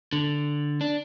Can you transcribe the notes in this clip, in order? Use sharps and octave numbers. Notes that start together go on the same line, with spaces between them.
D3
D4